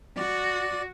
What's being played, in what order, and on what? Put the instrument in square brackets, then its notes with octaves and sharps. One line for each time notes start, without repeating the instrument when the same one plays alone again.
[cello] F#4 [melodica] D5